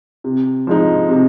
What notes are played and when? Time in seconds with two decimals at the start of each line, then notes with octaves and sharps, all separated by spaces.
0.24 C3
0.67 F3 G#3 D#4
1.09 C3